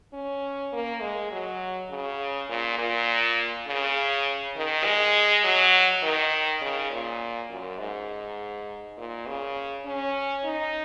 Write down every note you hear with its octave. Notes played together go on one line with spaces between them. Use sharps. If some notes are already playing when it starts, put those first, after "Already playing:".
C#4
A#3
G#3
F#3
C#3
A#2
A#2
C#3
D#3
G#3
F#3
D#3
C#3
A#2
F#2
G#2
A#2
C#3
C#4
D#4